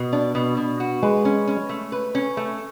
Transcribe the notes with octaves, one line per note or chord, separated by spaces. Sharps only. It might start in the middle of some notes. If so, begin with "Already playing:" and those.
Already playing: B2
D4
B2
B2
F#4
G#3 B4
C#4
C#4
A3
B4
C#4
A3